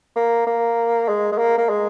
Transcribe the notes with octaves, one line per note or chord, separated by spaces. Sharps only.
A#3
A#3
G#3
G#3
A#3
A#3
G#3